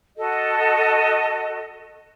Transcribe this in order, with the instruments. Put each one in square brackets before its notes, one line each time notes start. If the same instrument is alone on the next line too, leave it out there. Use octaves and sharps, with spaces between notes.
[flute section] F#4 A4 D#5